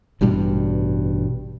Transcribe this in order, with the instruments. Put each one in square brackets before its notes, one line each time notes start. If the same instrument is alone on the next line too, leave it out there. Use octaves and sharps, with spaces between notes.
[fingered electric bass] A1 G2 B2 G3